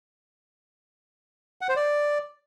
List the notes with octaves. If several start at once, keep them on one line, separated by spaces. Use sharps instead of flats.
F#5
C5
D5